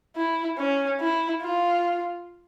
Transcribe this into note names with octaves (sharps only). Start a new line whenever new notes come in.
E4
C#4
E4
F4